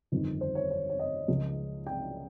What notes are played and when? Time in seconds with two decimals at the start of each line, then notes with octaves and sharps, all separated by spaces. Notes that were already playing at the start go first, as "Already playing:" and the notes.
0.12 G1 F2 D#3
0.41 C5
0.55 C#5
0.70 C#5
0.89 C#5
0.99 D#5
1.28 C#2 C#3 F3
1.87 G5